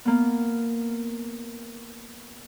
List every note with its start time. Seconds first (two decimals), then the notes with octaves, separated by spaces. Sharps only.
0.05 A#3 B3